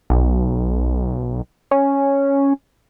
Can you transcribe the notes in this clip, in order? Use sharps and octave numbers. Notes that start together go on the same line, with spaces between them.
B1
C#4